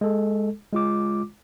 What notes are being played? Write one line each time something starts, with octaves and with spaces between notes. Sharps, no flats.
G#3 A4
G#3 F4 D6